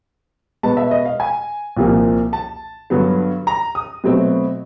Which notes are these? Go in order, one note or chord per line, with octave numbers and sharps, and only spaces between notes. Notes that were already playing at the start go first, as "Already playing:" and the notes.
B2 G#3 B3 A5
E5
D#5
F5
G#5
C2 A#2 F3 A#3
A5
G2 D3 F#3 B3
A#5
D#6
B2 F#3 A3 C4